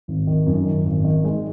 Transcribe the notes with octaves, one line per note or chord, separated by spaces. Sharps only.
G#1
D#3
F#2
D#3
G#1
D#3
G#3